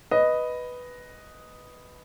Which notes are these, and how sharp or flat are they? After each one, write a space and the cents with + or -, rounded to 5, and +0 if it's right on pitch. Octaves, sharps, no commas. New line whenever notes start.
B4 +0 D#5 +0